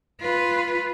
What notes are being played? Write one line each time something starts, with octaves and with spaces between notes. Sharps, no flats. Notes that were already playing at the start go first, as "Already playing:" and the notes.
F4 B4